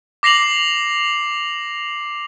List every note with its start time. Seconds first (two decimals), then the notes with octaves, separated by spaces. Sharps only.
0.23 D6 A#6 C7 F7 F#7